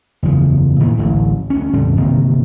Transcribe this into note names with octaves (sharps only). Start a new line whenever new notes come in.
F#1 E2 F3
A#2 D#3 E3
D1 A1 A2
D2 C#4
A#1 F2 D3 G3
G1 C3 D#3 A#3